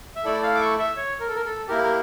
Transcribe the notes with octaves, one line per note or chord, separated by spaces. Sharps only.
E5
A3 E4 A4 D5
F5
D6
C#6
E5
C#5
A#4
A4
A#4
A4
A#3 E4 G4 A#4
A#4